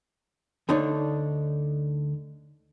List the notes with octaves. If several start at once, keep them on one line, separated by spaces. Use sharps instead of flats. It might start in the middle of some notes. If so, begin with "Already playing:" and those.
D2 D3 D4 D#4 C#5